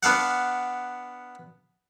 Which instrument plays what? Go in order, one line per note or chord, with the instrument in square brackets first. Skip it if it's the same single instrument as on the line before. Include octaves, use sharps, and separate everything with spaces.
[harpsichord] B3 D4 F5 F#5